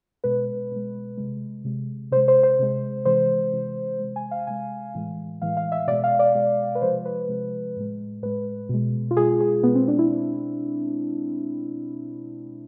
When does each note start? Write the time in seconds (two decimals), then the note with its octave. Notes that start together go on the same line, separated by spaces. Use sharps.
0.24 B2 G#3 B4
0.71 B2 G#3
1.17 C3 G#3
1.64 C3 G#3
2.11 C3 C5
2.17 G#3
2.28 C5
2.43 C5
2.59 C3 G#3
3.05 C3 E3 G#3 C5
3.53 C3 E3 G#3
4.00 C3 G#3
4.16 G#5
4.31 F5
4.47 C3 G#3 G#5
4.95 A2 E3 G#3
5.41 A2 E3 G#3 F5
5.57 F5
5.72 E5
5.87 B2 D5
5.91 G#3
6.04 F5
6.19 D5
6.35 B2 G#3
6.75 B4
6.82 C3 F3 G#3 C5
7.05 B4
7.29 C3 F3 G#3
7.77 A2 G#3
8.22 A2 G#3 B4
8.69 B2 G#3
9.11 F4
9.17 B2 G#3 G#4
9.41 G#4
9.63 B2 B3
9.68 G#3
9.75 C4
9.88 D4
9.99 E4